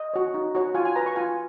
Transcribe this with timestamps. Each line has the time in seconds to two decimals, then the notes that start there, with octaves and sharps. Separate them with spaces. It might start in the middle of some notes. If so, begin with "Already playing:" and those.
Already playing: D#5
0.14 F#4 C#5
0.34 D#4
0.55 F#4 C#5
0.75 F4 G#5
0.85 G#5
0.96 B4 A#5
1.06 C#6
1.16 F4 G#5